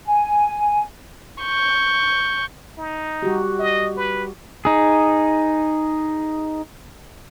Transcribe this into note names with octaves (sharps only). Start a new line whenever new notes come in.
G#5
C#6 G6
D#4
G3 F#4 G4
D#5
B4
D#4 G#4